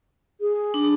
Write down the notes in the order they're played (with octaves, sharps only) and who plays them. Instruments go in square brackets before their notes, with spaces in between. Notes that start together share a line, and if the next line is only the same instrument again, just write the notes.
[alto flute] G#4
[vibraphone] D4